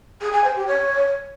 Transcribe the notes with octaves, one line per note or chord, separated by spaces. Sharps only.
G#4
G#5
C5
G4
C#5